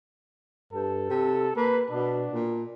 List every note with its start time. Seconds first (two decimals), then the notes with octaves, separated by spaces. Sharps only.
0.73 G2 A4
1.10 C3
1.56 A#3 B4
1.90 B2 D4
2.32 A#2